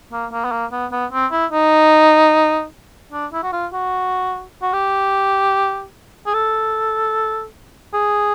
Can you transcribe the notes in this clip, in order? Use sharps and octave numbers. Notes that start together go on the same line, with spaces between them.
A#3
A#3
B3
A#3
B3
B3
C4
E4
D#4
D4
E4
F#4
F4
F#4
F#4
G4
G#4
A4
G#4